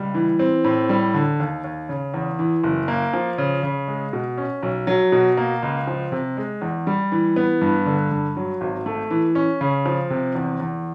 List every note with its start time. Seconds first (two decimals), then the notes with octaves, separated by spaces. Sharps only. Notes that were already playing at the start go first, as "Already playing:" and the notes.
Already playing: C#2 G3
0.14 E3
0.39 C4
0.64 A2
0.89 G3
1.14 D3
1.39 D#2
1.64 D#2
1.89 C#3
2.14 E2
2.39 E3
2.63 F#1
2.88 A#3
3.14 F3
3.38 C#3
3.63 C#3
3.88 G#3
4.13 B2
4.38 C#4
4.63 B1
4.87 F#3
5.12 B2
5.37 A#3
5.63 C#2
5.87 F3
6.12 C3
6.37 G#3
6.62 E2
6.87 G3
7.12 E3
7.36 B3
7.61 G2
7.86 D3
8.11 G2
8.37 F#3
8.61 G#1
8.86 A3
9.11 E3
9.35 C#4
9.61 C#3
9.86 F3
10.10 C3
10.35 E2
10.60 E2